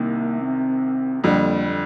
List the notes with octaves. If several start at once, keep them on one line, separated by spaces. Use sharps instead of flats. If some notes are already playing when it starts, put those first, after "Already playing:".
Already playing: C2 C3 D#3 A#3
C4
F2 D3 G3 A#3